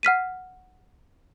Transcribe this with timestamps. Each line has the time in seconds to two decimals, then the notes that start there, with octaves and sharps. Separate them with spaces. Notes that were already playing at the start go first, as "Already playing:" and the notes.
0.03 F#5 F6 B6 D#7